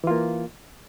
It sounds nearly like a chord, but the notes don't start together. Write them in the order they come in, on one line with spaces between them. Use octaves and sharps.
E3 F4 A#3